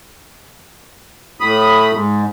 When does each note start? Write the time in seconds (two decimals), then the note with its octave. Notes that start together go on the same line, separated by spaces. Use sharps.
1.40 A2 B5 D#6
1.93 G#2